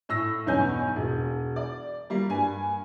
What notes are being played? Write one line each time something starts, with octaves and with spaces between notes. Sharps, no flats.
A2 E6 A#6
B1 E2 G2 C#4 G#5 G6
E1
D5
G3 A#3
G2 G#5